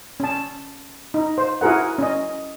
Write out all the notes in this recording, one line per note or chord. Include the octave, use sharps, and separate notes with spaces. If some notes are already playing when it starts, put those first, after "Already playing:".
C#4 A5
D#4
C5
E4 F#4 G#4 A#4 F#5
C#4 D#5